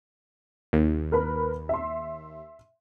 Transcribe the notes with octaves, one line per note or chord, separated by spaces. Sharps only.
D#2
A#4 B4 B5
E5 C6